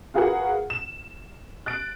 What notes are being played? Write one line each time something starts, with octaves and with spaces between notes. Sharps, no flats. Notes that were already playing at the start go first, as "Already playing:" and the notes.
F4 F#4 G#4 A#4 B4 F#5
E7
F#6 A6 D7